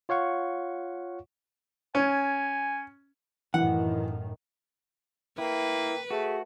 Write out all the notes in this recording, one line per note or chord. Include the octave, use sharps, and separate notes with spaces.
F4 C#5 F5 F#5 C#6
C#4 G#5
F#2 A2 D#3 E3 F#5
A#3 E4 B4 G5
A3 F#4 G#4